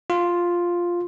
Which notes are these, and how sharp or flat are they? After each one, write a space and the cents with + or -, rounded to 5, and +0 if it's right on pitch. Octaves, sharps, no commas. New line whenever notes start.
F4 +0